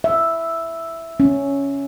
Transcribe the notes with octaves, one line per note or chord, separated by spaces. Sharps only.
E5
C#4